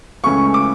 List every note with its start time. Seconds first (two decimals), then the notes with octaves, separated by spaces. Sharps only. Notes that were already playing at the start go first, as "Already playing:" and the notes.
0.24 C#2 C#3 E3 A3 C#4 C#6
0.54 D6